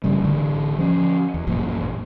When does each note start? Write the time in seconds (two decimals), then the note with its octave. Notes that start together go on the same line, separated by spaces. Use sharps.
0.04 G2 C#3 G3
0.21 A1 D3
0.78 F3 C#4
1.34 E2
1.47 A1 F#2 A#2